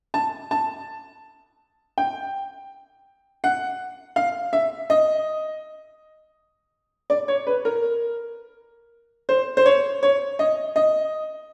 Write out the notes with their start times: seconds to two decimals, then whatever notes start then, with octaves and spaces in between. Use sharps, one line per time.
0.14 A5
0.51 A5
1.98 G5
3.44 F#5
4.16 F5
4.53 E5
4.90 D#5
7.10 D5
7.28 C#5
7.47 B4
7.65 A#4
9.29 C5
9.57 C5
9.66 C#5
10.03 C#5
10.39 D#5
10.76 D#5